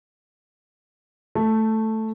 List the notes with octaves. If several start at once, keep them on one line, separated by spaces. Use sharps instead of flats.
A3